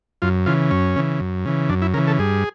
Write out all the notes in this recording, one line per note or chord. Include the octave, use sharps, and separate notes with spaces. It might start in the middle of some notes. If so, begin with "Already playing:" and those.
F#2 F4
C#3 E3 F4
F#2 C#4
C#3 E3
F#2
C#3 E3
F#2 D4
E4
C#3 E3 A#4
A4
G2 G#4